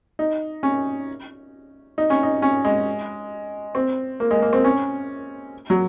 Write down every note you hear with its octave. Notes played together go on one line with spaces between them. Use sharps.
D#4
C#4
D#4
C#4
D#4
C#4
G#3
C4
A#3
G#3
A#3
C4
C#4
F#3